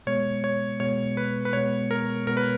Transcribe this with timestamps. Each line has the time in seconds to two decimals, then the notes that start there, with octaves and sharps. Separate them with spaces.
0.07 B2 G#3 B3 C#5
0.44 C#5
0.80 B2 G#3 B3 C#5
1.17 B4
1.45 B4
1.53 B2 G#3 B3 C#5
1.91 A#4
2.27 B2 G#3 B3 A#4
2.37 B4